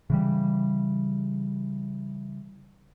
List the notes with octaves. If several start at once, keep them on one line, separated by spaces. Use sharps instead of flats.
C#3 E3 G3